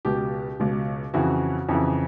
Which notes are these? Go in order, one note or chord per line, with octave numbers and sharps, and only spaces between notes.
C#2 B2 G4
C#2 B2
F2 C#3 E3 F#4
F2 C#3 E3